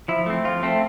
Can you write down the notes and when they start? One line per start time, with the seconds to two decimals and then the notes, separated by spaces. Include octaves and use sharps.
0.08 F3 E4
0.26 A3 C4
0.45 F3 F4
0.63 A3 C4